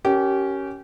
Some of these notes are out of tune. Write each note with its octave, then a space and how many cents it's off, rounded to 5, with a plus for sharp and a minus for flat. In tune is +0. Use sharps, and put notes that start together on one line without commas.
C#4 +0 G4 -25 A#4 +0